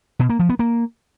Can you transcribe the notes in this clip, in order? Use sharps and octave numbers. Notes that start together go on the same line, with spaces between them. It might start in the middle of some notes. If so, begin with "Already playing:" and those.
B2
A#3
F3
B3
A#3